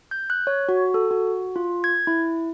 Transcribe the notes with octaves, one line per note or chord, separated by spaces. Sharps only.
G6
F#6
C#5
F#4
A4
F#4
F4
G#6
E4